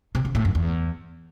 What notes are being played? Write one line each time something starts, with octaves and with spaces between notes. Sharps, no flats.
C3
C#3
A2
F#2
E2